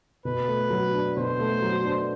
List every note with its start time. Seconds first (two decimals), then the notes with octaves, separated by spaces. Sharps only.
0.25 B2 B4
0.48 A3
0.70 F#3
0.93 D4
1.16 B2 C5
1.39 A3
1.62 F#3
1.85 D4